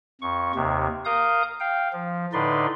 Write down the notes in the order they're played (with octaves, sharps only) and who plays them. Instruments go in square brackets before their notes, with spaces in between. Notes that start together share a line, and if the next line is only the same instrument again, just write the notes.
[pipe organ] F2 C#6
D#2 C3
A#4 F5 D#6 G6
F5 G5
F3
A2 D3 D#4 B4 D5 C6